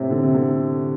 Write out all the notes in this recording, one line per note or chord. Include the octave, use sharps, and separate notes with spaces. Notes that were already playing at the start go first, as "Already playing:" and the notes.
Already playing: A2 C3
D3
C3
D3